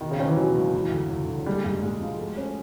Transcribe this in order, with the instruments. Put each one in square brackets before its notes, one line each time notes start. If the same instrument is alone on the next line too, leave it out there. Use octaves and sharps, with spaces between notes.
[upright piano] B2 [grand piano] D#3
[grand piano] C#3
[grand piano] D#3 [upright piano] C#4
[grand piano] E3
[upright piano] B2 [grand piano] F#3
[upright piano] C#2
E3
D2
D2
D2
[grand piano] G3 [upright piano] G#3
[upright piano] G#2 [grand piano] G3
[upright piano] G#2 [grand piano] G#3
[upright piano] F3
A3
C#4